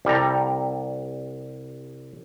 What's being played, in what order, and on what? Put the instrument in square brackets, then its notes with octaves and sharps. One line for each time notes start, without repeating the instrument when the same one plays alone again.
[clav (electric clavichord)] C2 G3 A4 A#5